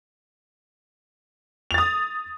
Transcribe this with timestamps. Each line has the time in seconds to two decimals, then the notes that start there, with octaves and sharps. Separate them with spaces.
1.71 F7
1.74 A6
1.78 D#6